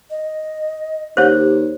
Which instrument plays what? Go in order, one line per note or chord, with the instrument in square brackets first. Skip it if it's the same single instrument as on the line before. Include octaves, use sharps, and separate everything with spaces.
[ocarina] D#5
[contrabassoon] D#2 [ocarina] G4 [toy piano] C5 C#5